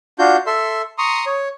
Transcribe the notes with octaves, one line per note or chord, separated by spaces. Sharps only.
D4 F4 F#4 G6
A4 E5 C6
A#5 C6 C#6 D#6
C#5